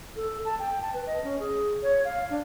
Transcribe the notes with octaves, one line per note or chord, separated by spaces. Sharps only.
A4
A5
G5
A5
B4
D#5
C#4
G#4
C#5
F5
D4